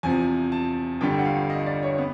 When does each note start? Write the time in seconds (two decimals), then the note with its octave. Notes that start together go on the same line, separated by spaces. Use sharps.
0.03 E2 C3 F3 G#5
0.52 A5
1.01 G1 G2 D3 G3 G5
1.19 F#5
1.25 F5
1.50 D#5
1.66 D5
1.83 C#5
1.98 B3